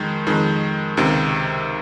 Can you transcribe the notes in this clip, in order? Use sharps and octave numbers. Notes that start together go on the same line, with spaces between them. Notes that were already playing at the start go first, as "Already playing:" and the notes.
Already playing: F2 D#3 G#3
F2 D#3 G#3
C#2 C3 D#3